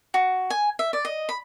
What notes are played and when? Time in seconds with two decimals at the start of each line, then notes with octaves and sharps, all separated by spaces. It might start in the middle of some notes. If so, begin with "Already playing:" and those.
0.14 F#4
0.50 G#5
0.79 E5
0.93 D5
1.05 D#5
1.29 B5